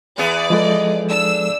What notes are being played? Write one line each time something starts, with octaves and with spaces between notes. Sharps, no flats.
E2 B3 G#4 D5
F3 G#3 A4 D#5
D4 E6